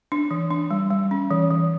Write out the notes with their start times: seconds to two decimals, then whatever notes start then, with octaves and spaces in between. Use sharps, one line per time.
0.12 D4
0.31 E3
0.51 D4
0.71 G3
0.91 G3
1.11 C#4
1.31 E3
1.51 E3